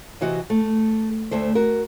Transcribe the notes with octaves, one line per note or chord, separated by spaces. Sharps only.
C3 E3 F#4 D#5
A3
D2 A3 C5
F#4 A#4